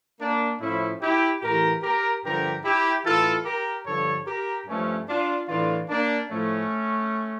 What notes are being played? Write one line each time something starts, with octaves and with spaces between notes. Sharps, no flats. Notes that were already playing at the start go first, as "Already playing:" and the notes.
A#3 D4
A2 F3 C#4 E4
E4 G4
A2 E3 G4 A#4
G4 A#4
G2 D3 F3 G4 A#4
E4 G4
A2 E3 F4 A4
G4 A#4
G2 D3 F3 A4 C#5
G4 A#4
G2 F3 A3 C#4
D4 F4
A2 E3 D4 F4
A#3 D4
A2 F3 A3 C#4